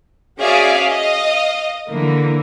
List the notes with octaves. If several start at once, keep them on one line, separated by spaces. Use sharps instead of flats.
C#4 F#4 G#4 D5 E5 F5
D#5 F5
D3 E3 A#3